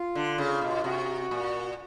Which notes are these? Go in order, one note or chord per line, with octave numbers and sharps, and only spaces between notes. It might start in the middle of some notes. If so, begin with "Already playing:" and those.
Already playing: F4
D3
C#3
B2
C3 F#4
A#2